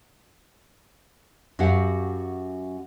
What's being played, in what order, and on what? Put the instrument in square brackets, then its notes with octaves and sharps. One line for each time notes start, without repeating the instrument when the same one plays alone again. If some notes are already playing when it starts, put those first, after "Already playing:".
[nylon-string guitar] F#2 F#4 G4 F5 F#5